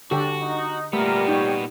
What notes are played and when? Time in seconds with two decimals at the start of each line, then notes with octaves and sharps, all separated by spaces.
0.11 D3 D4 F#4 G4 A4
0.42 D#4
0.93 A#2 G3 A3 B3 A#4
1.28 D#4 C#5 G5